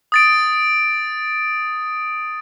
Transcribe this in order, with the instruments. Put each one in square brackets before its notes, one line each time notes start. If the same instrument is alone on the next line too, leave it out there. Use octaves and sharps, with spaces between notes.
[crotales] D#6 A6 D7